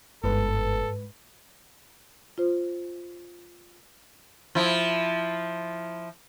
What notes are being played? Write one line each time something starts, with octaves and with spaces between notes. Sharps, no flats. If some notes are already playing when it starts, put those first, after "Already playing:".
G1 G#2 A4 B4
F4 C5
F3 E4